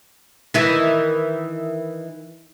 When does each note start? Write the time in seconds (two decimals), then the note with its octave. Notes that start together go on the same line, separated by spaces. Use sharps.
0.54 D#3 E3